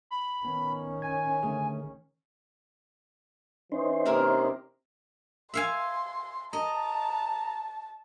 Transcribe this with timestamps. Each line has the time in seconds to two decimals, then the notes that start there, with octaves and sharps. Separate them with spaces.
0.11 B5
0.45 D#3 B3 C#4
1.02 G#5 G#6
1.43 D3 A3 G#4
3.72 E3 C#4 D#4 C5
4.05 C3 A#3 E4 A#4
5.54 E5 F5 G#5 C6
6.53 D#5 A5 A#5